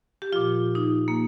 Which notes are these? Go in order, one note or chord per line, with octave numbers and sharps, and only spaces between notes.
G4
A#2 F3 F4
D#4
A#3